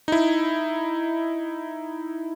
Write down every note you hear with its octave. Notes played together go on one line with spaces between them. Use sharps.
D#4 E4